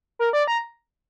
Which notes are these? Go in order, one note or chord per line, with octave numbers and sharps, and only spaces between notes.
A#4
D5
A#5